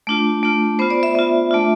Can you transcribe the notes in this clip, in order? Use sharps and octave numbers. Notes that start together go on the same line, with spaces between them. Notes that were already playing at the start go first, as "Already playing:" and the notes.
A3 D4 F4
A3 D4 F4
B3 F4 C5
D5
E5
B3 F4
A3 D4 F4